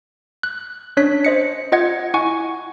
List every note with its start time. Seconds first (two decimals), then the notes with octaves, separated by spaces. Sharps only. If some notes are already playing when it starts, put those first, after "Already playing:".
0.43 F#6
0.97 C#4 D4 C#5 F#6 B6
1.25 C5 D#5 C#7
1.72 F4 D#5 F#5 G#6 C#7
2.14 E4 F#5 G#5 C#6